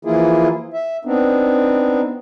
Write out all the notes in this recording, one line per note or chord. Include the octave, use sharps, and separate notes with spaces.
E3 F3 A#3 E4 F4 G#4
E5
B3 C4 D4 D#4